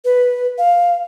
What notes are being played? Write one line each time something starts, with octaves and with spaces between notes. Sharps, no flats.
B4
F5